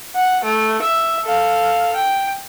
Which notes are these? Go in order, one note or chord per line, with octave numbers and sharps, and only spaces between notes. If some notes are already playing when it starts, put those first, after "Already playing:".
F#5
A3
E5
A4 F5
G5